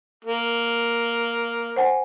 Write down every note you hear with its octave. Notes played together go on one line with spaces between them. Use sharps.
A#3
C5 F#5 G#5